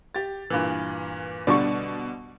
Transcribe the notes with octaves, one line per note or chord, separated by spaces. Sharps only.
G4 A6
G2 A#2 E3
B2 D3 G3 D5 C#6